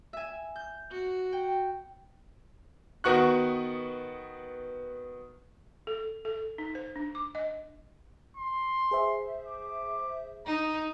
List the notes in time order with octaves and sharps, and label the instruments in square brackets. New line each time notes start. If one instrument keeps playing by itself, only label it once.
[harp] E5 G#5
G6
[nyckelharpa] F#4
[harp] G5
[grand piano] D#3 B3 F#4 C#6 F#6
[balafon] A4
A4
D#4
C5
D4
D6
D#5
[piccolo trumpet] C6
[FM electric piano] G#4 C5 E5
[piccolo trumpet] D6
[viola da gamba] D#4 [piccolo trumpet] A#5